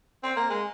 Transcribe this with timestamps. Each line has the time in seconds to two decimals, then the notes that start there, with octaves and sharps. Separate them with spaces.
0.23 C4
0.37 A#3
0.50 G#3